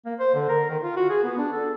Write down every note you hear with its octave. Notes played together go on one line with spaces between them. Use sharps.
A#3
C5
D3
A#4
D#3
F4
F#4
G#4
B3
D4
A4